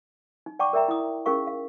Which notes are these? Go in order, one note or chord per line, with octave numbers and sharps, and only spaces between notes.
D#4
D5 F#5 G5 A5 C#6 D6
A#4 D5 E5 G5 A#5
E4 D#6
C#4 D#4 G#4 A#4 F5 C#6
F5